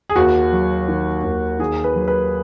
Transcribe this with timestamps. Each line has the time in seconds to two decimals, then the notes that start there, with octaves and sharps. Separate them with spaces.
0.10 G#4
0.16 D#2 F#4
0.52 F#3
0.88 D#3
1.24 D#2
1.59 D#3 G#4
1.84 B4
1.95 F#3
2.08 B4